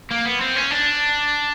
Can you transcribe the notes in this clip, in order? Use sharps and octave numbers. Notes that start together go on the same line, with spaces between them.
A#3
B3
C4
C#4
D4